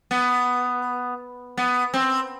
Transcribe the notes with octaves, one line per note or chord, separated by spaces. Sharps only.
B3
B3
C4